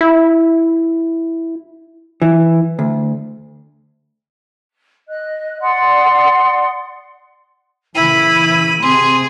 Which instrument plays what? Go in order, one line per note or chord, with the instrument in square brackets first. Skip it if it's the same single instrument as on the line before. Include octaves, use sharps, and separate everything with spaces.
[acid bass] E4
[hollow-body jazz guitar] E3
D2
[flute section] D#5 F#6
D5 F#5 C6 D#6
[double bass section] A#2 C#3 E3 [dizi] E4 [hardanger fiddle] B5 [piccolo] D#7
[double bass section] C3 C4 [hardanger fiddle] G#4 [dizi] C6